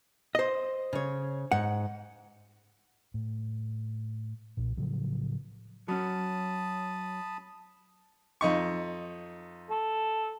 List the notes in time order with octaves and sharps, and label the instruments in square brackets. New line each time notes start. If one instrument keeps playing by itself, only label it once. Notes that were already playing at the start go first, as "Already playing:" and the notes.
[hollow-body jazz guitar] C5 D#5
[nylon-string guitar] C#3 C#5
[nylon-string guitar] G#2 [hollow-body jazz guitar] F#5
[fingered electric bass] A2
B1 A#2
A2 C#3 F3 F#3
[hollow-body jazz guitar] F#3 C#4 [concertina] A5 B5 D#6
[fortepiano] F2 D#4 C#6
[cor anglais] A4